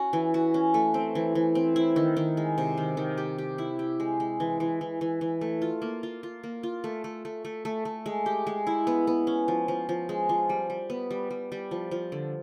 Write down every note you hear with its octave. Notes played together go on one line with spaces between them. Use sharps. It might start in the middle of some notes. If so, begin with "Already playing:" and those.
Already playing: C#4 F#4
E3
F#4
C#4
A3
C4
E3
E3
C4
E4
D#3
D#3
G#3
C3
D#3
D#3
G4
G4
E4
G4
G#3
G#3
E3
E3
E3
E3
E3
A3
F4
A#3
F4
F4
A#3
F4
A3
A3
A3
A3
A3
A3
G#3
G4
G#3
E4
B3
B3
C#4
F3
F3
F3
G#3
F3
G3
G3
B3
G3
G3
G3
F3
F3
D3